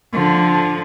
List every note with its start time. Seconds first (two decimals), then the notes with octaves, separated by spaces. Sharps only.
0.13 D3 F3